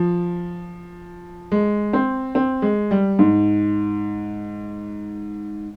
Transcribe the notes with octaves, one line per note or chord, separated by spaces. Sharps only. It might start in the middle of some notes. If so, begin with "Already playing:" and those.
Already playing: F3
G#3
C4
C4
G#3
G3
G#2